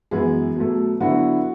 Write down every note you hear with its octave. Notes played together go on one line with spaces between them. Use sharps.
F#2 E3 G#3 B3 G#4
B2 F#3 A3
D3 F#3 B3 E4 F#4